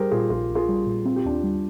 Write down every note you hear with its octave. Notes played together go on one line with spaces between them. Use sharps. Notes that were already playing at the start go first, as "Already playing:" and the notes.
Already playing: G3 G4 G#4 A#4 C5
A#2 F4 G#4
A#1 F4 G#4
A#1
F4 G#4
G3
A#2
C4 F4
G4
D#2 D4 F4
G3